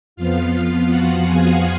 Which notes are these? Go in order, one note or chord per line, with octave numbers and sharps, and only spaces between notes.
F2 F3 B3 F4 F5
F#4 F#5
G#4 G#5